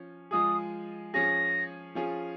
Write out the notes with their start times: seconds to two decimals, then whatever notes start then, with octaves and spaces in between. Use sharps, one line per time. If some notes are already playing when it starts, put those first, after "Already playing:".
Already playing: F3 C#4
0.31 F3 G#3 F4 G#4 D#6
1.14 F3 C#4 F4 G#4 A#6
1.95 F3 C#4 F4 G#4